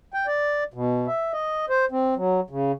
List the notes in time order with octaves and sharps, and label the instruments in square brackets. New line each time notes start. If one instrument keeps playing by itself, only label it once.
[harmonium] G5
D5
B2
E5
D#5
C5
C4
F#3
C#3